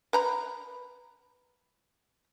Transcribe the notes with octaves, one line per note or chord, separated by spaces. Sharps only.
B4 A#5 B5